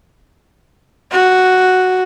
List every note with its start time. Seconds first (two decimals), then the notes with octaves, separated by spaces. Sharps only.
1.12 F#4